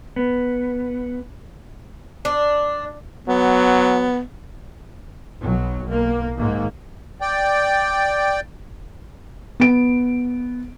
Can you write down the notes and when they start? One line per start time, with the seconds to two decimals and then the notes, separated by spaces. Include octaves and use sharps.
0.16 B3
2.25 D4
3.28 F#3 B3
5.41 B1 F#3
5.85 B1 A#3
6.38 G#2 D#3 A#3
7.21 D5 G5
9.60 B3 D7